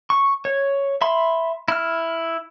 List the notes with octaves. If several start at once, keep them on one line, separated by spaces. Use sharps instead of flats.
C#6
C#5
E5 B5 C6
E4 F6